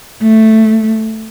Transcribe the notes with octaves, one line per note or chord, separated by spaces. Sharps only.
A3